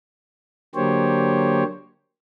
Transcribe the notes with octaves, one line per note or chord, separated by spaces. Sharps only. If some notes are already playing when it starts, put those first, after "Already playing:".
D3 F#3 A#3 G4 C5 C#5